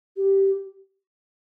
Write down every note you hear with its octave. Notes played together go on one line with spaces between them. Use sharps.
G4